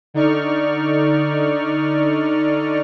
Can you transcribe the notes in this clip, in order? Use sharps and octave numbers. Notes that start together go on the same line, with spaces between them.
D3 D#4 D5 C#6 F6